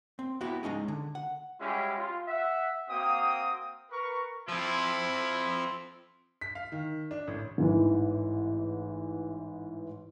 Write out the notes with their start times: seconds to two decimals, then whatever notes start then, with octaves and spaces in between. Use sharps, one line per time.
0.19 C4
0.41 B3 E4 F#4 G4
0.63 G#3 C#4 D#4 G#4
0.88 D3
1.15 F#5
1.60 G3 G#3 C#4 E4 F#4 G4
1.98 F4
2.27 E5 F#5
2.89 A#3 C4 F#4 G5 D#6
3.90 A#4 B4 C#6
4.48 F3 C4 E4
6.41 B6
6.55 F5
6.72 D#3
7.11 D4
7.27 A1
7.58 A1 G#2 E3